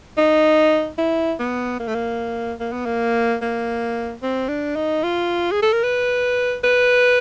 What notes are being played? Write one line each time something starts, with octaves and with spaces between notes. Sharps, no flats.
D#4
E4
B3
A#3
A3
A#3
A#3
B3
A#3
A#3
C4
D4
D#4
F4
G#4
A4
A#4
B4
B4